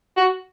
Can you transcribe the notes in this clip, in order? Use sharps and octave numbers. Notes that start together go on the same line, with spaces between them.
F#4